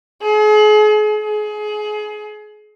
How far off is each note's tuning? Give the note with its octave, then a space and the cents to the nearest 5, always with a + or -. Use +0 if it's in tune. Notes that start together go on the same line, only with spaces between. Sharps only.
G#4 +40
G#4 +25